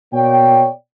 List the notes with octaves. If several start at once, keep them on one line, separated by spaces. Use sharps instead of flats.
B2 A#3 C#5 D5 G5